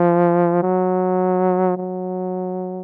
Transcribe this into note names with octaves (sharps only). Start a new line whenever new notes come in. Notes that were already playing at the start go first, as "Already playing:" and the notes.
Already playing: F3
F#3
F#3